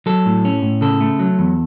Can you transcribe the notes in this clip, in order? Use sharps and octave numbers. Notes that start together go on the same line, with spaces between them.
F#3 A4
A2
C#4
A2
C#3 A4
A3
F#3
E2